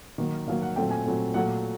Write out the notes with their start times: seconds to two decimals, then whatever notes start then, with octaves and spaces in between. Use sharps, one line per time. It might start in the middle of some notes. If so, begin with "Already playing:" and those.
0.18 D#3 F#3 A#3
0.47 D#3 F#3 A#3 F5
0.62 F#5
0.76 A#2 F#3 A3 C4 G5
0.90 G#5
1.06 A#2 F#3 A3 C4
1.34 A#2 F#3 A3 F#5